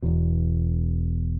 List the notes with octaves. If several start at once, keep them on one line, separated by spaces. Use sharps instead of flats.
E1 E2 B2